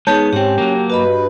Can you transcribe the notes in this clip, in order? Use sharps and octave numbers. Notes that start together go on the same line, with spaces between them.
G#3 B3 D#4 G#4 C#5 A5 G6
G#2 C4 C#4 G4 G5
F#3 A#3
G2 F#4 B4 D#5 B5